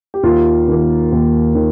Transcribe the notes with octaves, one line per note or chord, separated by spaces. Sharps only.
G4
D#2 F4
D#3 A#3
D#2
D#3